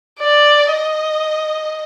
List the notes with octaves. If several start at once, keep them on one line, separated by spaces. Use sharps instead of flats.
D5
D#5